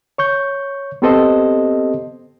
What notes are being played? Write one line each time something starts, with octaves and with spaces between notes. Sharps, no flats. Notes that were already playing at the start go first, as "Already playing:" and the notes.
C#5 C#6 G6
B3 C4 G4 A4 C5 D#5